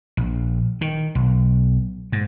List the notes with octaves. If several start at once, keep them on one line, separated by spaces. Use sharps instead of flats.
A#1
D#3
B1
G#2